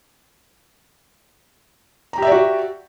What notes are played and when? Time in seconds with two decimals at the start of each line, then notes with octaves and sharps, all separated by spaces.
2.13 A#5
2.18 G4
2.22 E5
2.27 D5
2.32 F#4